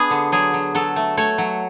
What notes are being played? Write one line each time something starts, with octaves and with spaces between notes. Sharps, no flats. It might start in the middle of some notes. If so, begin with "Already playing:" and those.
Already playing: B3 D4 G#4
D3
F#3 G#4
F#3
F#3 A4
A3
A3 C#5
F#3